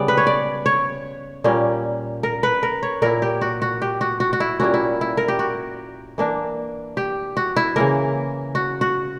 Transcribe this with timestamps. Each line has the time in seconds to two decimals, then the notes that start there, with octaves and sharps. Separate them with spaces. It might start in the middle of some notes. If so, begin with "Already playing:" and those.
Already playing: C#3 G3 B3 D5
0.08 B4
0.17 C#5
0.27 D5
0.66 C#5
1.44 A#2 G3 A#3 C#4
2.23 A#4
2.43 B4
2.63 A#4
2.83 C#5
3.02 A#2 A#3 E4 A#4
3.22 G4
3.41 F#4
3.62 F#4
3.82 G4
4.01 F#4
4.20 F#4
4.33 F#4
4.40 E4
4.60 A#2 G3 A#3 C#4 F#4
4.74 E4
5.01 E4
5.17 A#4
5.28 G4
5.39 F#4
6.18 E3 A#3 D4
6.97 G4
7.37 F#4
7.56 E4
7.76 C#3 E3 A#3 A#4
8.55 F#4
8.81 F#4